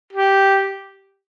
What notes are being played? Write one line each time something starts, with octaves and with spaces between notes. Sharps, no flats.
G4